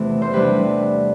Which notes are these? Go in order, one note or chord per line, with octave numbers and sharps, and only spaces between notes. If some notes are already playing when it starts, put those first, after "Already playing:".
Already playing: E2 C3 E3 A3
C5
C3 E3 G3 D4 B4